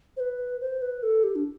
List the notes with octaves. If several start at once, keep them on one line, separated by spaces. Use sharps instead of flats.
C5
B4
C5
B4
A4
G4
D4